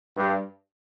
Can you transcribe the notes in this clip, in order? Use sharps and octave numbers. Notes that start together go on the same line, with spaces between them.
G2